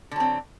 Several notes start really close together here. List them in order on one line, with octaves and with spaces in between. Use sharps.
D3 F#3 C4